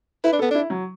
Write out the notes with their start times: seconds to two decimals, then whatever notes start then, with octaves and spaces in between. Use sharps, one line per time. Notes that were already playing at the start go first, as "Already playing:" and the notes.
0.24 E4 B4
0.33 D4
0.39 B3 A4
0.51 D4 E4
0.70 F#3